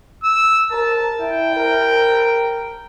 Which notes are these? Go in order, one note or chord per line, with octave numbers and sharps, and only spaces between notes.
E6
A#4 A5
E4 G5
A#4